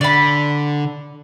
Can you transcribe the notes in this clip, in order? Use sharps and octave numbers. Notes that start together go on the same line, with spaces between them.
D3 D5 B5